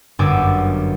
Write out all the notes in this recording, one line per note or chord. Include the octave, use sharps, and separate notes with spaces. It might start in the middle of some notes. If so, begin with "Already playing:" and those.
G1 F#2 B3 G#5 D6 E6